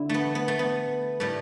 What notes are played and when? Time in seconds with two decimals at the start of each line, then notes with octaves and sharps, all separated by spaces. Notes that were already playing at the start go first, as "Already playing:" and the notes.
Already playing: D3 E4
0.09 A3 B3
0.35 B3
0.48 A3
0.59 B3
1.20 A2 G3 A3